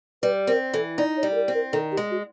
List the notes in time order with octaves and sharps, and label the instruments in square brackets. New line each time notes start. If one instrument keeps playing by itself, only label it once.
[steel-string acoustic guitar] G3 [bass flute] B4
[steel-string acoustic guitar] C4 [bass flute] A#4
[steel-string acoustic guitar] E3 [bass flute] A4
[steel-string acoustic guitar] D#4 [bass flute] D5
[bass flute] C#5
[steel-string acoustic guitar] G3
[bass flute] A4
A#4
[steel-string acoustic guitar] C4
[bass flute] A#4
[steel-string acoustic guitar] D#3 [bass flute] A4
[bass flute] G4
[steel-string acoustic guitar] G#3
[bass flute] F#4